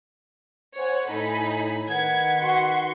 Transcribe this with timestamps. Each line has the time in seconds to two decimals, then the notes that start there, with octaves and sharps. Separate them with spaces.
0.77 C5 C#5 F#5 G#5
1.09 A2 D#4 A4 B5
1.89 D#3 B4 F#5 G#6
2.39 F#4 C6 C#6